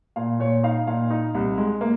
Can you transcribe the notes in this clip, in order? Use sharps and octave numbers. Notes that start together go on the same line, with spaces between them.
A#2 F5
A#2 C#5
D#4 F5
A#2 F5
D#4
C2
G#3
A#3